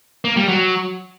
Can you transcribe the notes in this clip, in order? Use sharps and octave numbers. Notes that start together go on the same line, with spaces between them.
A#3
G3
F#3